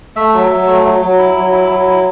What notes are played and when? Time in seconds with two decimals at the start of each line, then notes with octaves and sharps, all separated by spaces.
0.16 A3 E5
0.34 F#3
0.51 F#3
0.67 A3
0.85 F#3
1.01 F#3
1.18 E4
1.36 F#3
1.53 E4
1.70 F#3
1.87 E4